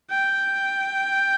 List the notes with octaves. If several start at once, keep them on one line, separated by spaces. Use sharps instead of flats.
G5